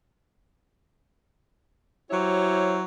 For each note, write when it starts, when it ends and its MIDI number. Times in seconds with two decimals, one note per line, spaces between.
2.11 2.84 54
2.11 2.84 64
2.11 2.84 67
2.11 2.84 72
2.11 2.84 73